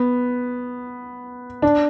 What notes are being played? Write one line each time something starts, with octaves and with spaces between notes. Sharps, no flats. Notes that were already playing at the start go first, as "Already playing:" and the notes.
Already playing: B3
D4